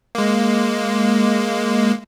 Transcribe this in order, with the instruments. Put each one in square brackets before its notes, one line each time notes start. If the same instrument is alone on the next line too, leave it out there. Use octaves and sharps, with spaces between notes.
[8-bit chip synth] G#3 A#3